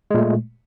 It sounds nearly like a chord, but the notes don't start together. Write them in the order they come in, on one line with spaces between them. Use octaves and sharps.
G#3 A#2 A3